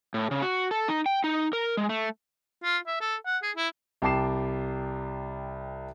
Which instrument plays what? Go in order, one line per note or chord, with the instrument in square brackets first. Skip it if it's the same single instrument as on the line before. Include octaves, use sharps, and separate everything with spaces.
[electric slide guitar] A2
C#3
F#4
A4
D#4
G5
D#4
A#4
G#3
A3
[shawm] F4
E5
A4
F#5
G#4
E4
[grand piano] C2 G5 A5 D6 C7 E7